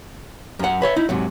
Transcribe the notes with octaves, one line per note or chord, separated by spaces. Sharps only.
F#2 F#5
B4 C#5 E5
D#4 E4
G#2 C3 F#3